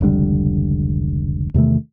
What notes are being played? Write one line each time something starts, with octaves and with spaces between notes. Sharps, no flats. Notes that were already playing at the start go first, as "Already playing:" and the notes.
F1 C#2 D3 G3
E2 C3 D#3 A3